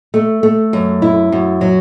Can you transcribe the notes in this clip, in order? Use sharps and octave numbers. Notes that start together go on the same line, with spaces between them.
A3
A3
F#2
E4
F#2
F#3